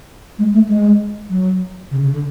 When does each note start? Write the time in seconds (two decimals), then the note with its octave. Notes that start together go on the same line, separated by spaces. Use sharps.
0.39 G#3
0.54 A3
0.69 G#3
1.30 F#3
1.91 C#3
2.02 C#3
2.12 D3